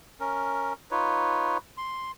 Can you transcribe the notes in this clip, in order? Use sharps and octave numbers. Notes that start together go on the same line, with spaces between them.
C#4 A#4
D#4 F4 B4 C#5
C6